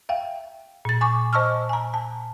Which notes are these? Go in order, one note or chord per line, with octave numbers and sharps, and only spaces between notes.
E5 F5 G5
A#2 A6
G#5 C#6 D6
C5 D#5 A5 C#6 E6 F6
G#5 A#5
A5